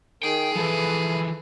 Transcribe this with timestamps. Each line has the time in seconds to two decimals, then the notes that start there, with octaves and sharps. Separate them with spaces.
0.23 D#3 G#4 G5
0.56 E3 F3 A4 B4